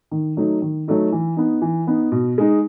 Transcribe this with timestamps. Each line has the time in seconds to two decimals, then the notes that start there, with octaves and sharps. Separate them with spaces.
0.11 D#3
0.37 F#3 A3 D#4
0.62 D#3
0.88 F#3 A3 D#4
1.12 E3
1.37 B3 D#4
1.62 E3
1.87 B3 D#4
2.12 B2
2.38 G#3 D#4